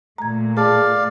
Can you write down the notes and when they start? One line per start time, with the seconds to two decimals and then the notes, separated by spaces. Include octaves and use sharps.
0.18 A#2 A3 A#5 G#6
0.57 G#4 D5 F5 A5